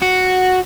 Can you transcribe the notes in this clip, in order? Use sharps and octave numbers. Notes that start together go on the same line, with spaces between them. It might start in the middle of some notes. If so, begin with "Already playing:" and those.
F#4